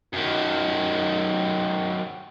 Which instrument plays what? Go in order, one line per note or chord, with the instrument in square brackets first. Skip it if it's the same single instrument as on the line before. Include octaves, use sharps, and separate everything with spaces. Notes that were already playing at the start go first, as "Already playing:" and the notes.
[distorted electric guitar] F#2 D#3